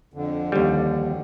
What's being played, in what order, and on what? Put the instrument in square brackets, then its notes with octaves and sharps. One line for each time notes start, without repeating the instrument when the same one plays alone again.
[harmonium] F2 D3
[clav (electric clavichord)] D#2 G3